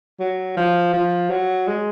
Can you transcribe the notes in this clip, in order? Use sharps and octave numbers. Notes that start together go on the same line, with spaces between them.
F#3
F3
F3
F#3
G#3